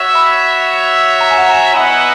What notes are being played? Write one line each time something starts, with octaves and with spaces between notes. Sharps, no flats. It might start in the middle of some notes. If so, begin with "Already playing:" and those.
Already playing: F#4 C#5 E5
B5
A#5
G#5
F#5
A#5
G#5
B3 E4 B4 D#5 F#5